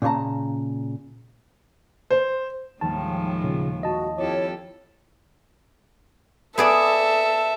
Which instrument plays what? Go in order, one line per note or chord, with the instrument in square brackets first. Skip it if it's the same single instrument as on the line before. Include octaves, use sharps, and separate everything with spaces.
[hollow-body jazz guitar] A#2 C#3 C#5 A5 A#5
[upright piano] C5
[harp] D#2 F3 G3 [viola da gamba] A2 D#3 G#3 [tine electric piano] A5
[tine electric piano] A#2 C#3
[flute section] F#4 [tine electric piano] D#5 A5
[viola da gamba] F2 G4 A4 [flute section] E4 C#5 [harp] D6
[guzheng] B3 G#4 D5 [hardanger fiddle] A4 [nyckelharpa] E5